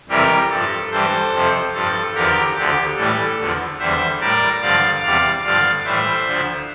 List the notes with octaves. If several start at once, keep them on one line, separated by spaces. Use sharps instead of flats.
F2 C3 E3 G3 G4 A#4
G2 F3 A4
G2 E3 G3 A4 C5
F2 C3 F3
G2 F3 A4
E2 D3 F3 G4 A#4
D2 D3 F3 G4
A2 E3 G3 A4
E2 D3 F3
E2 D3 G3 C5 E5
A2 G3 A#4 D5
G2 D3 F3 D5 F5
E2 C3 G3 D5 F5
G2 D3 F3 D5 F5
A2 E3 G3 C5 E5
D2 D3 F3